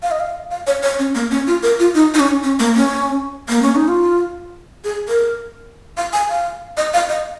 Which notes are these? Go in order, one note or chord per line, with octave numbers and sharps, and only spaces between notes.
F5
D#5
F5
F5
C#5
C#5
C#4
A#3
C#4
F4
A#4
F4
D#4
D#4
C#4
C#4
A#3
C#4
A#3
C#4
D#4
F4
G#4
A#4
F5
G#5
F5
D#5
F5
D#5